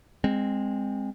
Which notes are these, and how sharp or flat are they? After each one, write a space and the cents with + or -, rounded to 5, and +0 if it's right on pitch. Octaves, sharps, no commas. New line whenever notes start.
G#3 -20 C4 +0